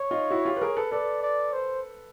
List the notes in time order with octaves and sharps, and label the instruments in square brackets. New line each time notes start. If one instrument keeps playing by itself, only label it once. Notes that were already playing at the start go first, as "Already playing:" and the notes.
Already playing: [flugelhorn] C#5
[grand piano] D#4 F4
E4 F#4
F4 G4
B4
G#4 A#4
A4 B4
[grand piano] A4 B4 [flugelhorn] D5
[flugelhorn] D5
C5